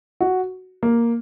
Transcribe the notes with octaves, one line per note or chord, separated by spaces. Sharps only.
F#4
A#3